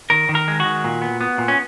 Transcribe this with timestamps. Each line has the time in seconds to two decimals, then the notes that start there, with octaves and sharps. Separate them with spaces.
0.10 D#3 A#4
0.29 D#3
0.35 A#4
0.48 G#3
0.60 F#4
0.65 D#3
0.84 A#2
1.02 B3
1.21 B3
1.38 A#2
1.48 C#4